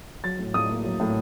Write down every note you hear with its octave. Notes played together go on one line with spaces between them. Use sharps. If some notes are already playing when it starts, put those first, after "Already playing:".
F#3 A6
A2
A2 D#6
A#3
F#3
A2